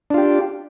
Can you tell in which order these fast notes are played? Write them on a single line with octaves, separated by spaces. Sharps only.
D4 F4 G4